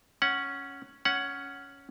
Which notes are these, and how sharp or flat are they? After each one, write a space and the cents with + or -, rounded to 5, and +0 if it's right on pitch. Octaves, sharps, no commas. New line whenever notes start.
C#4 +0 F#5 +0
C#4 +5 F#5 +0